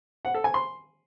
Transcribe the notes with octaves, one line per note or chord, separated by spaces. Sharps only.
F#5
A4
G#5
C6